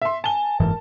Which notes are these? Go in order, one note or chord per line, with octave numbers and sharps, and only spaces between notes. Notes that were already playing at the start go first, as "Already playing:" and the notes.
E5 C6
G#5 A5 G7
F#1 G#2 E3 A#4